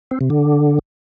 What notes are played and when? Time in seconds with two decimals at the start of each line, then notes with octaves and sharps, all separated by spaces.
0.11 C4
0.21 C3
0.30 D3